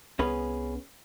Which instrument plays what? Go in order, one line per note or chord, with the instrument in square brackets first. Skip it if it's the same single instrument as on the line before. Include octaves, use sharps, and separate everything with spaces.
[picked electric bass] C2 B3 [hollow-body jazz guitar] C#4 G#4 B4